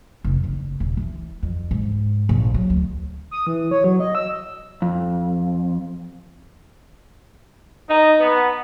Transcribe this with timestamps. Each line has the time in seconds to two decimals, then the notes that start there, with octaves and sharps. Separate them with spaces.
0.24 F1
0.44 F#1
0.80 D#1
0.97 E3
1.43 F2
1.71 G#2
2.29 A#1
2.54 F#3
2.70 D2
3.31 D#6
3.47 E3
3.71 C#5
3.84 F#3
4.00 D#5
4.15 E6
4.82 F2
7.89 D#4
8.20 B3